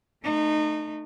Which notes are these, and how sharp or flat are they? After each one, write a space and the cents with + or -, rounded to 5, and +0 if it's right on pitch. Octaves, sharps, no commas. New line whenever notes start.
A3 +0 D#4 -30